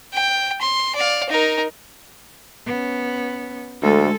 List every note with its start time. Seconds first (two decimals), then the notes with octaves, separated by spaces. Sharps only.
0.13 G5
0.61 C6
0.96 D5 F5
1.29 D#4 A#4
2.66 B3 C#4
3.82 D2 G#3 A4